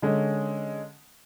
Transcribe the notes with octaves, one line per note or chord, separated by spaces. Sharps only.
D3 G#3 C#4